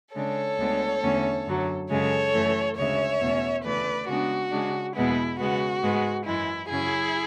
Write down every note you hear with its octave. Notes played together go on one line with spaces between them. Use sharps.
C#3 G#3 D4 A4 C#5
D2 D3 G#3 B3 D4
E2 D3 A3 C#4
F#2 D3 F#3
F#2 C#3 G#3 A4 C#5
F#2 E3 A3
D2 C#3 G#3 C#5 E5
E2 B2 A3 C#4
D2 C#3 E3 A3 B4 D5
C#3 G#3 B3 D4 F#4
C#3 G#3 D4
E2 B2 G#3 B3 E4
C#3 G#3 B3 F#4
G#2 G#3 B3
F#2 E3 G#3 E4
F#2 C#3 F#3 C#4 E4 G#4